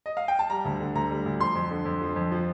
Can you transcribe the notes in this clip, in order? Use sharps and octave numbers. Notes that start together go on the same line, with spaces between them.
D#5
F5
G5
A5
G3 A#5
D2
D3
D2 A#5
G3
D2
F3 C6
F2
D3
F2
F3
F2
F3